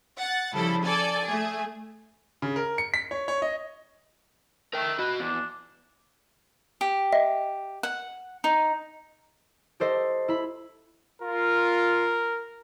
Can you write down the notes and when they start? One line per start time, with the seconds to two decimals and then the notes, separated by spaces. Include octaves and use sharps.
0.19 F#5 A6
0.55 C#3 F3 G3 E4 A4
0.84 A4 D5 G#5
1.26 A3 G#4
2.42 C#3
2.56 A#4
2.78 C#7
2.94 B6
3.11 C#5
3.28 C#5
3.42 D#5
4.73 A3 A#4 G5
4.99 F#4 B4 D#5
5.20 E2 D4
6.81 G4
7.13 D#5 E5
7.83 F#5
8.44 D#4
9.80 G4 A4 C5 D#5
10.28 E4 B5
11.22 F4 A#4